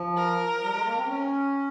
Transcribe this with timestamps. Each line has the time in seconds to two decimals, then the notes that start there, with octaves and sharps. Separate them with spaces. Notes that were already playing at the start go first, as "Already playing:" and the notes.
Already playing: F3
0.17 A#4
0.54 F3
0.62 G3
0.74 G#3
0.85 A#3
0.96 C4
1.07 C#4